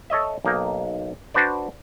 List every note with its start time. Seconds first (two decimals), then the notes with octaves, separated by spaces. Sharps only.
0.10 A4 C#5 D#5 E5
0.45 B1 A#3 D#4
1.34 D4 F#4 B4 C5 D5